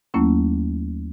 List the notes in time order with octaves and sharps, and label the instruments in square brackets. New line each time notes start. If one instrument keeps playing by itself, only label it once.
[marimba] D#2 F#3 A3 A#3 C#4 E4